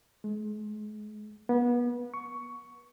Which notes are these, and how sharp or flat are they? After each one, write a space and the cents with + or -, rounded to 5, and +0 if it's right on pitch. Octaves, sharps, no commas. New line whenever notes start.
G#3 +35
B3 -30
C#6 +10